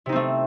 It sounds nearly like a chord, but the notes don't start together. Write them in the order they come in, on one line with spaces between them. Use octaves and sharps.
C3 D#4 C4 A3